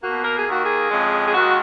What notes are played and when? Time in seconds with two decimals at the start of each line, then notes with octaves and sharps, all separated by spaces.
0.03 B2 A#3 F#4
0.25 A#4
0.38 G#4
0.47 D#2 D#3 A#3 F#4
0.65 G#4
0.91 F2 C#3 G#3
1.28 G#4
1.34 D#2 D#3 G#3 F#4